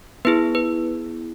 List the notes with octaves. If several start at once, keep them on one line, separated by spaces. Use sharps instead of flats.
B3 E4 G#4 B4
B4